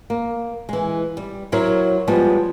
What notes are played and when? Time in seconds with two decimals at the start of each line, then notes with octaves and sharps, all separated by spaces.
0.10 A#3
0.69 E3 G#3
1.17 G3
1.52 F#3 E4 A#4 C5 C#5
2.08 F3 G3 G#3 B3